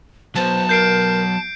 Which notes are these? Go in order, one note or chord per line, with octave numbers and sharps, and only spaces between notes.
F#3 B3 C5 A5
A#4 G6 C7 D7